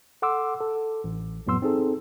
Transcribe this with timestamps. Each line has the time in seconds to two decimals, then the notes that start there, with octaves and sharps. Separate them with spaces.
0.22 A4 F#5 C6 D6 E6
0.60 A4
1.04 A1
1.47 F2 A2 F#3 B3 C6 E6
1.62 C4 D#4 G#4 A4